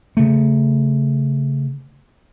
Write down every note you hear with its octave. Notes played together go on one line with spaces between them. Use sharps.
C#3 A3